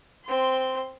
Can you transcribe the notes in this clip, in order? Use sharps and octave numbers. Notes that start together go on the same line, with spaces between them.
C4 C6